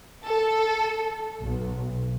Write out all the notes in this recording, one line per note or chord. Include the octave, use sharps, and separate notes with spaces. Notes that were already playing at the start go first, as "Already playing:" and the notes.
A4
B1